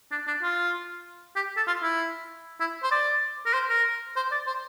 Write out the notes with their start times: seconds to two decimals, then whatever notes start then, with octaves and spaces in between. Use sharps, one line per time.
0.12 D4
0.27 D4
0.43 F4
1.36 G4
1.57 A4
1.67 F4
1.83 E4
2.60 E4
2.83 C5
2.91 D5
3.46 A#4
3.54 C5
3.69 A#4
4.16 C5
4.31 D5
4.47 C5